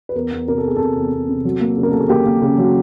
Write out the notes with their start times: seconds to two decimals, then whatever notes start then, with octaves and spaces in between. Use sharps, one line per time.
0.09 B4
0.15 E2 A#4
0.32 E2
0.47 C3 A#4
0.58 A4
0.65 E2 G#4
0.76 C3 A4
0.97 E2
1.13 E2
1.29 C3
1.45 F#3
1.61 A#3
1.77 C#3
1.83 A#4
1.92 A#3 A4
2.00 G#4
2.09 A#3 G4
2.26 A#3
2.42 C#3
2.58 F#3